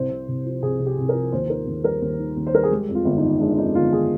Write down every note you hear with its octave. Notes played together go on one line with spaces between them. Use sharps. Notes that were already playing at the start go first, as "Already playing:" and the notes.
Already playing: C2 C5
C3
C2
F3
C2 G#4
C3
G4
C2
A#4
F3
D#2 C5
D#3 A#4
D#2
G3 A#4
D#2
D#3
D#2
C5
G3 A#4
G#4
G#3 G4
F2
F4
G1
D#4
D#3
G#3 D4
F2 D#4
G1 F4
D#3 G#4